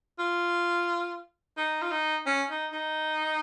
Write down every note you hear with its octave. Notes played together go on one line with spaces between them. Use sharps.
F4
D#4
F4
D#4
C#4
D#4
D#4